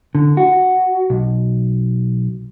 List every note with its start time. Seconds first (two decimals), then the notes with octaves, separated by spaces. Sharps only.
0.15 D3
0.37 F#4
1.10 B1